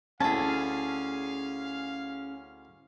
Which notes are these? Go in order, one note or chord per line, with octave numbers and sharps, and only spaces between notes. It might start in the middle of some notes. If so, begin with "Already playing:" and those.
D2 C#4 E4 G#4 F5 A5